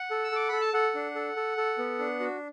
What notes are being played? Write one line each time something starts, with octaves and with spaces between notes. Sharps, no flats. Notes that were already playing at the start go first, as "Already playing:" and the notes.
Already playing: F#5
A4
E6
A4 D6
A4 B5
A5
A4 F#5
D4
A4
A4
A4
B3
D4
F#4